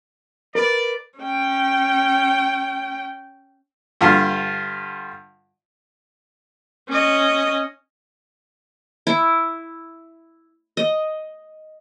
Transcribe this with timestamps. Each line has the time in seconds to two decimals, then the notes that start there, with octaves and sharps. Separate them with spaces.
0.55 A#4 B4 D5
1.19 C#4 G5
4.01 G2 D3 F4
6.89 C#4 D#5
9.07 E4
10.77 D#5